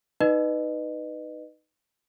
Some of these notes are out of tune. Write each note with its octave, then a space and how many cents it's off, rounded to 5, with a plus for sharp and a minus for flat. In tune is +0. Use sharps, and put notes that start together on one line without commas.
D#4 +0 B4 +0 D#5 -30